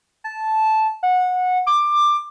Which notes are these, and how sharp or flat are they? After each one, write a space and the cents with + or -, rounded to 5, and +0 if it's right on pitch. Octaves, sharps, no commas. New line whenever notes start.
A5 -10
F#5 -20
D6 +15